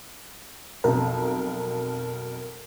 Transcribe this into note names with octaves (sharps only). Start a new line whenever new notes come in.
B1 F2 A#4